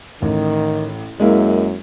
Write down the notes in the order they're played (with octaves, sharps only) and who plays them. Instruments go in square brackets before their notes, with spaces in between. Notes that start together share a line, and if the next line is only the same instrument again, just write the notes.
[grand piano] A1 [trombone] D#3
[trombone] F#2 [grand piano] G#3 A#3 E4